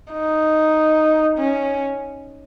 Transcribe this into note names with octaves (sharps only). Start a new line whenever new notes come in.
D#4
C#4